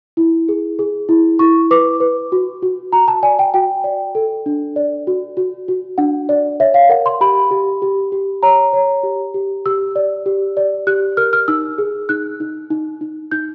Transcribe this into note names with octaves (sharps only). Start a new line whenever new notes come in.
E4
G#4
G#4
E4
E4 C#6
B4 D6
B4
F#4
F#4
F#4 A#5
A5
D5 G#5
G5
F#4 G5
D5
A4
D4
D5
F#4
F#4
F#4
D4 F#5
D5
C#5 E5
F5
A#4 F#5
C6
G4 B5
G4
G4
G4
C#5 A#5
C#5
G4
G4
G4 E6
D5
G4
D5
G4 F#6
A#4 F6
F6
D#4 E6
G#4
D#4 F#6
D#4
D#4
D#4
D#4 G6